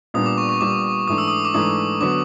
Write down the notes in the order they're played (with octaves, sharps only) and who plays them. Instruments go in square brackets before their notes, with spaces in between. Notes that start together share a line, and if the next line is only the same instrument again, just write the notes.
[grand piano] A#2 G3 B3 D4 [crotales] D#6
[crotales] D6
C#6
C#6
[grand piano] A#2 G3 B3 D4 [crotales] D6
[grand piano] G#2 E3 A3 D4 [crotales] D#6
[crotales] E6
D#6
D6
[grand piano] G#2 E3 A3 D4 [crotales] D#6
[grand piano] D3 F#3 B3 [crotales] D6